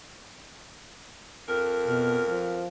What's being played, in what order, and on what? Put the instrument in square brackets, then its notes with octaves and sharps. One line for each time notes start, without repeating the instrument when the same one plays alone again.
[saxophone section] F2 A#4
[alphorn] B2
F3